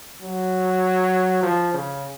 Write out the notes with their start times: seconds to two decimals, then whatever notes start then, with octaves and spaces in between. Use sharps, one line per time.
0.22 F#3
1.43 F3
1.74 C#3